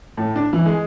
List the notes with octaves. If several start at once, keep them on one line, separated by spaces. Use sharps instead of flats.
A2
D4
E3
G#3